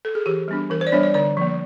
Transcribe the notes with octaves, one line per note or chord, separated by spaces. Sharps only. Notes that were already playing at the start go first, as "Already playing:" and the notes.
A4
G#4
E3 G4
G3 B3 D4
E3 A#4
C5
D5
G3 B3 D4 C#5
D5
D3 D5
F3 A#3